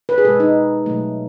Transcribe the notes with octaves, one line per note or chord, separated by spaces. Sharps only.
B4
G#4
B2 G#3 A4
D#4
B2 F#3 A3